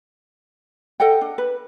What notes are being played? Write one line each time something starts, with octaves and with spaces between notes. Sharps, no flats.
A4 D#5 F#5 G5
D4
B4